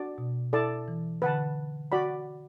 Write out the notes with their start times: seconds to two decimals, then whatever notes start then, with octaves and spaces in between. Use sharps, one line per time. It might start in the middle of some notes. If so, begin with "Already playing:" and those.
Already playing: D4 F#4 D5 A5
0.18 B2
0.53 E4 A4 D5 A5
0.88 E3
1.22 D3 B4 F#5 A5
1.92 F#4 D5 B5